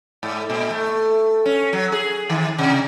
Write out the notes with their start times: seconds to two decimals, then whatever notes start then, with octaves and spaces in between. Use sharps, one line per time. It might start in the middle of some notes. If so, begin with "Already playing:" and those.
0.23 G#2
0.50 A#2
0.71 A3
1.46 C#4
1.73 F#3
1.92 G#4
2.30 D#3
2.58 C3